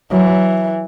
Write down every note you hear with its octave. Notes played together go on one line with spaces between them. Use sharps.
E3 F#3